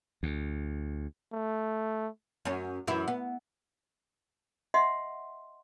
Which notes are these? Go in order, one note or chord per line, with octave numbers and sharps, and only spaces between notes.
D2
A3
F#2 C#4
F#2 E3 E4
B3
D#5 E5 F#5 C6